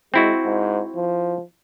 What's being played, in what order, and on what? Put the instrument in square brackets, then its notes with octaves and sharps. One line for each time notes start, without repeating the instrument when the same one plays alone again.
[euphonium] G#3 [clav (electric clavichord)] C4 E4 F#4
[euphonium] G#2
F3